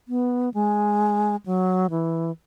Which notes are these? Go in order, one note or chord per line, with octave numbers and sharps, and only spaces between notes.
B3
G#3
F#3
E3